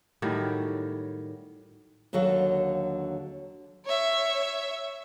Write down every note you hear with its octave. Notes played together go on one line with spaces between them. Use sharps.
A2 D#3 F#3 G3
D#2 D3 F#3 F#4 A4 F5
C#5 E5